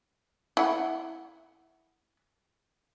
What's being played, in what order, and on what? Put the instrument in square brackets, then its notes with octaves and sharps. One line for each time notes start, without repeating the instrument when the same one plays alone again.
[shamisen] E4 F#5